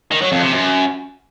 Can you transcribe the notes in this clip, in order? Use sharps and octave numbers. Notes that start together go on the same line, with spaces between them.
D#3
F#3
F2
C3
F#2